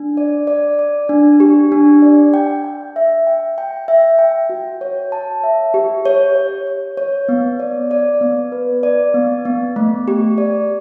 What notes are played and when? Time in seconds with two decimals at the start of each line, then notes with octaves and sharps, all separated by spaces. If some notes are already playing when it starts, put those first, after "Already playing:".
Already playing: D4
0.17 D5
0.47 D5
0.79 D5
1.09 D4
1.40 G4
1.72 D4
2.02 D5
2.34 G5
2.64 G5
2.96 E5
3.27 G5
3.58 G5
3.88 E5
4.19 G5
4.50 F#4
4.81 C#5
5.12 A5
5.43 E5
5.74 G4
6.05 C#5
6.35 C#5
6.67 C#5
6.97 C#5
7.29 B3
7.60 D5
7.91 D5
8.21 B3
8.52 B4
8.83 D5
9.14 B3
9.45 B3
9.76 A3
10.08 G4
10.38 D5